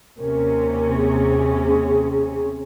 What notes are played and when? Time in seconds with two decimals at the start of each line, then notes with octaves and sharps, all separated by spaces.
0.18 D#2 C3 C#4 A#4
0.96 G#4